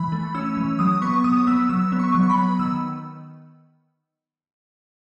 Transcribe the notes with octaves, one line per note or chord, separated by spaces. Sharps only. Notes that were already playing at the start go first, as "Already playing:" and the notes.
Already playing: E3 B5
A3
C#4 E6
E3
F#3 D#6
B3 C#6
F#3 D#6
B3 E6
F#3 E6
B3
C#6
F#3
C#6
B5
B3
D#3 E6